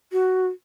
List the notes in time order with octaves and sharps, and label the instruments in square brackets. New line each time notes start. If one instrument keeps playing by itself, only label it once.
[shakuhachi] F#4